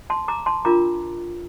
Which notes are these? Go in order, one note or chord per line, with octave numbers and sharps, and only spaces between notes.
A5 C6
A#5 D6
A5 C6
D4 F4 A#4 A#5 D6